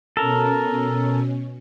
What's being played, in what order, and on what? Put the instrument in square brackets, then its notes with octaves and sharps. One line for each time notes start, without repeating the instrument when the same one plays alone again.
[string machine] B2 C#4 [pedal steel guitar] A4 A#4